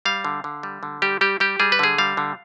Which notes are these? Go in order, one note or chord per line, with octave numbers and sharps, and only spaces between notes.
G3 F5
D3
D3
G3
D3
G3 G4
G3 G4
G3 G4
G3 G#4
B4
D3 G#4
G3 F5
D3